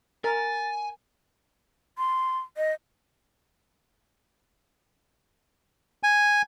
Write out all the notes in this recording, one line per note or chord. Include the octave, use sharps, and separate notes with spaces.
A#4 G#5 A6
C6
D#5
G#5